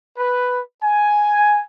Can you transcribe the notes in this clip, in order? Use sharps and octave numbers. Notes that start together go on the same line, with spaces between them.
B4
G#5